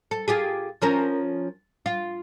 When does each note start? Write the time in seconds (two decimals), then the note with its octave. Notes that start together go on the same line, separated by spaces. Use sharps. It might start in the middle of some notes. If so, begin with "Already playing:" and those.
0.11 A4
0.28 F4 G4 G#4
0.82 F3 C#4 A#4
1.86 F4